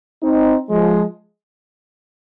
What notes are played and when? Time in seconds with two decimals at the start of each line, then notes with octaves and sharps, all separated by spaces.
0.23 C4 D#4
0.70 F3 G#3